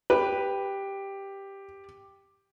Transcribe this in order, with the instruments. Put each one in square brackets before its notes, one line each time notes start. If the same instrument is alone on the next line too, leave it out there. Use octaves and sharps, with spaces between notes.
[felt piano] G4 [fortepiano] B4